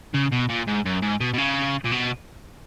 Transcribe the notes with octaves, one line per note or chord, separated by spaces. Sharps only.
C#3
B2
A#2
G#2
F#2
G#2
B2
B2
C#3
A#2
B2